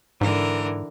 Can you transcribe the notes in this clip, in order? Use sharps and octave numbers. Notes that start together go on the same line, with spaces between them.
G#2 D3 E3 A#4